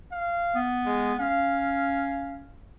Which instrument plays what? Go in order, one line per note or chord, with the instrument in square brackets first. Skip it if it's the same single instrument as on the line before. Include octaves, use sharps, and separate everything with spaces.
[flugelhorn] F5
[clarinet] B3
[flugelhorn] G#3
[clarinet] C#4 [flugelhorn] F5